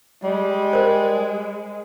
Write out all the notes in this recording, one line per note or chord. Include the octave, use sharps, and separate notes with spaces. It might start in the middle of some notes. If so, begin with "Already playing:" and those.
G3 G#3
A#4 C5